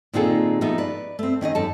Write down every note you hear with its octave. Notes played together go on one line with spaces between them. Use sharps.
A#2 D#3 C4 F4 G#4 A4
F3 A3 B3 D#4 F4
B4 D5
A3 C4
D#3 C#4 D5 D#5
F#2 A4 A5